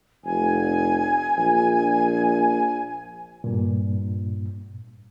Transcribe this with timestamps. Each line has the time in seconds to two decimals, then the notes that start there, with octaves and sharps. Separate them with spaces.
0.25 F1 G#5
1.38 A#1
3.44 G2 A#2